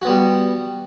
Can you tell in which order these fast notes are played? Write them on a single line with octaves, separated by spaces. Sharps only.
F#4 B3 G3